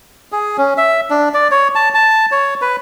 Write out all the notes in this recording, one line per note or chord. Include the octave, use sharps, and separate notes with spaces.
G#4
C#4
E5
D4
D5
C#5
A5
A5
C#5
B4